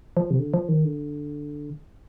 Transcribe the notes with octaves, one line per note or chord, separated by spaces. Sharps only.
F3
C3
D3
F3
D#3
D3